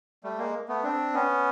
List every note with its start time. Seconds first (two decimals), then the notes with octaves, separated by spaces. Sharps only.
0.24 G3 A3
0.38 G#3 A#3
0.68 A3 B3
0.83 C4 D4
1.14 B3 C#4